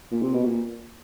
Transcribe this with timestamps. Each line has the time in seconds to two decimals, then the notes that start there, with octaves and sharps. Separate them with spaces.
0.11 A#2
0.22 C3
0.34 B2
0.45 A#2